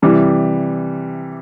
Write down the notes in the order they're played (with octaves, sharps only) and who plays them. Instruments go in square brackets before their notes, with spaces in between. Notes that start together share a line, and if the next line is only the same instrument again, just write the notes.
[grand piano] C3 E3 G3